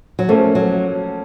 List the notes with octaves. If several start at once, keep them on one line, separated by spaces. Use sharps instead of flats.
F#3
F3 A3 A#3 C#4 A4
F#3